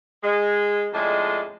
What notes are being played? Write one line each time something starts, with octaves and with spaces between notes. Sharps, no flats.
G#3
F2 A2 G#3 D4 D#5